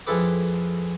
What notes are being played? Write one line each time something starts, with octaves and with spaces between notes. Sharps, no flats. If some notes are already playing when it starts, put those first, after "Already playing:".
F2 G#3 E4 A4 B4 D6